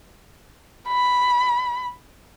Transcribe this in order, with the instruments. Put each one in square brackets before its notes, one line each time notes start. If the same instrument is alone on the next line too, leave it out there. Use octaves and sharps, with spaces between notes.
[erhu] B5